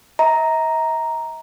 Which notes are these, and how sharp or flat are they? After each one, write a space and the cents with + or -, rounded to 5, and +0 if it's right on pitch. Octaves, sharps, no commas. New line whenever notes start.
E5 -45 A#5 +0